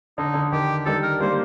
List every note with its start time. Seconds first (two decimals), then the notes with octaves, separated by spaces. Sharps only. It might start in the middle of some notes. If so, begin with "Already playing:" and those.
0.18 D3 D#4
0.34 D3
0.52 D#3 G4
0.86 D#3 G3 A4
1.03 A#4
1.20 G3 A#3 C5